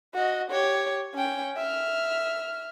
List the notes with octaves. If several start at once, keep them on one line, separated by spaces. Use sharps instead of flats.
F#4 D#5
G4 C#5
C#4 G5
E5 F6